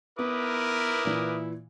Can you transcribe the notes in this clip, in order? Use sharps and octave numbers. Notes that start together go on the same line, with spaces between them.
B3 E4 A#4 B4 D6 D#6
A#2 E3